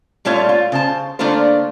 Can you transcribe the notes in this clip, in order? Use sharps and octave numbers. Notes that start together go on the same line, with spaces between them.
A#2 G3 A3 F4 C#5
F4
C#3 C5 A5
D3 A3 A#3 D4 F4 C5